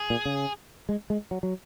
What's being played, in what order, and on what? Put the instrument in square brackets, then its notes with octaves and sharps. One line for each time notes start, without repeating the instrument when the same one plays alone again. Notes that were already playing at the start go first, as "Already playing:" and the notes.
Already playing: [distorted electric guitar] G#4
[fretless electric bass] A#2
C#3
G#3
G#3
F#3
F#3